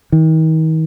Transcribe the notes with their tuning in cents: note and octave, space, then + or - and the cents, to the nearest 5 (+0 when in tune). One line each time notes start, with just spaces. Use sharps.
D#3 +40